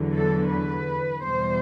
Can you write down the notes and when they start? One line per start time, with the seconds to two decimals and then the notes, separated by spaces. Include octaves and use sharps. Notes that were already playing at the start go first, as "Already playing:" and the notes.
Already playing: E2 D3 F#3
0.13 A4
0.50 B4
1.21 E2 B2 G3 C5